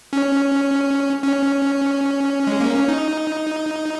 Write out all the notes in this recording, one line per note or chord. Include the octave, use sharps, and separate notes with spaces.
C#4
C#4
G#3
A#3
C#4
D#4